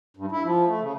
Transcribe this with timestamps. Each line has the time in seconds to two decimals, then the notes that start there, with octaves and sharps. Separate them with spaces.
0.17 G2
0.32 E4
0.44 F3
0.67 A3
0.82 C#3